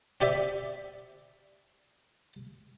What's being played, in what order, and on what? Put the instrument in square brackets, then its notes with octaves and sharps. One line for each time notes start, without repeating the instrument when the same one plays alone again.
[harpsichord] C4 G4 D5 E5